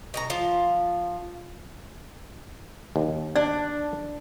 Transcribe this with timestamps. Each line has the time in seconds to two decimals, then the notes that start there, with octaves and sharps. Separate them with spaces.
0.14 B2 F#4 A#5
0.30 F3 F4
2.96 D#2
3.36 D4 D5